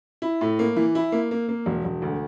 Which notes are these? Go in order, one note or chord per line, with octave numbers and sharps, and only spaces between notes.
E4
A2
A#3
E3
E4
A#3
A#3
A#3
E1
E1
D2